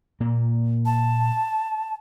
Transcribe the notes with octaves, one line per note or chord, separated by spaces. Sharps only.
A#2 A#3
A5